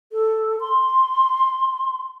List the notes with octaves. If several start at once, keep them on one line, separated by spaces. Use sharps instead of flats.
A4
C6